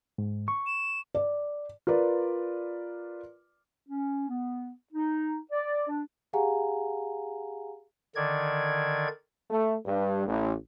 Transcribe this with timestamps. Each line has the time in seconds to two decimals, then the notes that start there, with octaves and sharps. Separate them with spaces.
0.18 G#2
0.48 C#6
0.66 E7
1.15 D5
1.87 F4 A#4 B4 D5
3.89 C#4
4.29 B3
4.93 D#4
5.52 D5
5.88 D4
6.33 G4 G#4 F5 F#5 G#5 A#5
8.15 D3 D#3 D5 G#6
9.50 A3
9.85 G2
10.26 A1